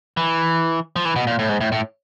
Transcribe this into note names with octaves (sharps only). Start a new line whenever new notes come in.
E3
F3
E3
B2
A#2
A2
G#2
A2
A2